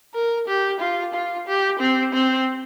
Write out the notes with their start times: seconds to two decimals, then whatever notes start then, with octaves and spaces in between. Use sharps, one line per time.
0.15 A#4
0.48 G4
0.80 F4
1.14 F4
1.47 G4
1.80 C4
2.14 C4